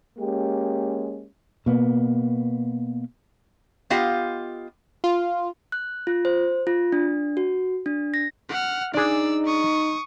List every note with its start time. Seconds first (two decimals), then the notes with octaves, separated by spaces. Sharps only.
0.18 G#3 A#3 C#4 G4
1.66 B2 A#3 B3
3.90 B3 F4 G4 D#5 F5
5.04 F4
5.72 F#6
6.07 F4
6.25 C5
6.67 F4
6.92 D4
7.37 F#4
7.86 D4
8.14 A#6
8.49 F#5 F6
8.94 D4 D#4 G#4 D5 E6
9.45 C#6 D#6